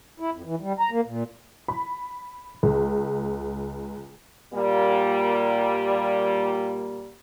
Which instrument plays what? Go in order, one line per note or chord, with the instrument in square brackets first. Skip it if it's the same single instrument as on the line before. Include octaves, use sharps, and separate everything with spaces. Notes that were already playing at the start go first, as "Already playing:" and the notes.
[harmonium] E4
F2
E3
G3
A#5
A#3
A#2
[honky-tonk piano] B5
C#2
[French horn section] A#2 G3 A#3